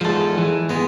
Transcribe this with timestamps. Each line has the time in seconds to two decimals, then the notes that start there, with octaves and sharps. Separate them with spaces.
0.01 E2 G#2 F3 A4
0.38 E3
0.69 G#2 G#3 B3